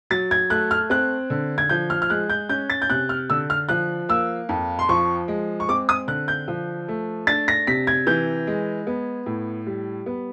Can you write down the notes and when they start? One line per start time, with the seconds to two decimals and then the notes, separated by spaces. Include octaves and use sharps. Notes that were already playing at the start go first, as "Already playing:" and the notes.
0.10 F#3 A6
0.31 G#6
0.50 A3 F#6
0.71 F6
0.90 C4 F#6
1.30 D3
1.58 G#6
1.69 F3 G6
1.90 F6
2.02 F6
2.10 G#3 F#6
2.30 G6
2.49 C#4 G6
2.70 A6
2.82 G6
2.90 C3 F#6
3.09 F6
3.30 D3 E6
3.50 F6
3.69 F3 F#6
4.09 A#3 E6
4.49 F2
4.79 C6
4.89 F3 C#6
5.28 G#3
5.60 C#6
5.69 C4 D6
5.89 D#6
6.08 D3 F#6
6.28 G6
6.48 F3
6.88 A3
7.27 D4 A6
7.48 A#6
7.67 C3 B6
7.87 G#6
8.07 E3 G6
8.47 G#3
8.87 B3
9.26 A2
9.66 G3
10.06 B3